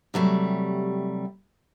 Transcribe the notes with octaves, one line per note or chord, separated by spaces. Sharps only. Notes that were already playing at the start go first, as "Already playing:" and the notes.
C3 F#3 G3 A3